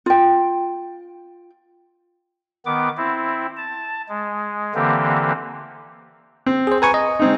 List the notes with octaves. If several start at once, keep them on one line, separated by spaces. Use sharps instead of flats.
F4 G5
D#3 B3 D6
C4 E4
A5
G#3
D3 E3 A#3 C4 G4
C4
G#4 C5
B4 G#5 A#5 C#6
D#5
G#3 C4 D#4